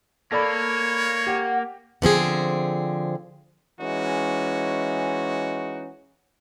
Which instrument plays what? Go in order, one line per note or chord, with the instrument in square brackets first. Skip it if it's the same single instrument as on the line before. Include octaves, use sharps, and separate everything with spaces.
[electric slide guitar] A#3 [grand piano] A4 D5 B5 [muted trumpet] C#5
[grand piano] G4 [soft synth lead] F#5
[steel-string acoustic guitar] D3 F3 C4 G#4
[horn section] E3 G#3 C#4 D#4 F#4